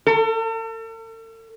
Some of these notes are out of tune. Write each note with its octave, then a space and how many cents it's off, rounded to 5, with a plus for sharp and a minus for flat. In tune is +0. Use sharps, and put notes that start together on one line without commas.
A4 +45